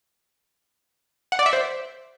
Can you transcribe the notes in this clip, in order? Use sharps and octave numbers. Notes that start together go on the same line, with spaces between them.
F#5
D5
E5
C5